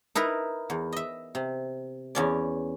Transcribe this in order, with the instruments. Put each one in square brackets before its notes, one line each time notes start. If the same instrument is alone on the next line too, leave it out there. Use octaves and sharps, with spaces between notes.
[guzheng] D#4 E4 A#4 B4
E2
D#5 E5
C3
E2 C#4 D5